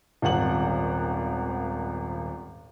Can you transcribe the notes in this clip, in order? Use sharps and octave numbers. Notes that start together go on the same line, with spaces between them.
D#1 G#1 F#5 F#7